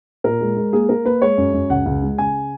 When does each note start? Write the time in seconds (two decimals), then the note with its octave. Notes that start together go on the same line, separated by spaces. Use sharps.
0.24 A#2 A#4
0.41 G#3
0.56 G#3
0.73 A#3 G#4
0.89 A#3 A#4
1.05 A#3 B4
1.21 G#3 C#5
1.37 F#2
1.53 F#2
1.70 C#2 F#5
1.86 C#2
2.02 G#3
2.18 C#3 G#5